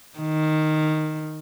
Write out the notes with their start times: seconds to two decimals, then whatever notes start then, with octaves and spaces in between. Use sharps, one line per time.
0.19 D#3